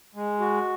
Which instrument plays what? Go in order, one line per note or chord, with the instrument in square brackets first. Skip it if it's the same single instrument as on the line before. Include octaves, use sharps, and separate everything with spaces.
[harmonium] G#3
F#4